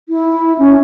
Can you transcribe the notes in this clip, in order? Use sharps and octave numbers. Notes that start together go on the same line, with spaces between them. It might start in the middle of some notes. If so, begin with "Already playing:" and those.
E4
C#4